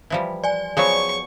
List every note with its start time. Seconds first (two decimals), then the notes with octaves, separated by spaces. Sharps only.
0.10 E3 F3 G3
0.44 D5 G#5
0.77 F3 F#3 B3 G#4 C#5 C#6